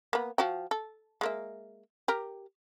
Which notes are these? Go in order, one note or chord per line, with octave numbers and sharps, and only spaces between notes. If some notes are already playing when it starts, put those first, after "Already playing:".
A#3 B3
F3 F#4 G5
A4
G#3 A#3 E5
G4 A#4